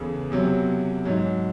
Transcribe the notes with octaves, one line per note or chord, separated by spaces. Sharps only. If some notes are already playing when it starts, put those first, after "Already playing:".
Already playing: E2 C#3 E3 A4
E2 C3 F#3
G#2 F#3